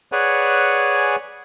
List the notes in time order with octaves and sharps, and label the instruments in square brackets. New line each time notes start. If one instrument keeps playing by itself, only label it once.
[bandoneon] G#4 B4 C#5 D5 F#5 G#5